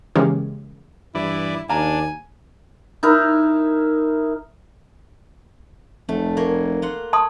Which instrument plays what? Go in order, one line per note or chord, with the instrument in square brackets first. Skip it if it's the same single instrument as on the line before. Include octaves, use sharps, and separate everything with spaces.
[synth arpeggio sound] C#3 E3 G#3 A#3 C#4 G4
[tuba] G2 [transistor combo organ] E3 D5 [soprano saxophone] E4
[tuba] D#2 [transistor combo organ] D4 [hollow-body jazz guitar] F5 A#5 [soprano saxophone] G#5
[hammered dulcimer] D#4 E4 A#4
[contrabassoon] F1 [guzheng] A3
[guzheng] A#3 C#5
F4 F#5 C6
[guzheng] C#5 [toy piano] A5 C6 D#6